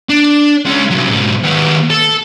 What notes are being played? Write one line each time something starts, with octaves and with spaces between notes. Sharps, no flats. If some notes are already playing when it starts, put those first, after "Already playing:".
D4
G#3 C#4
C2 F#3
G#2 B2
D#3 B3
A4